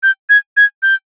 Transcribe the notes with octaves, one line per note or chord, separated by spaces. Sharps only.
G6
G#6
G#6
G6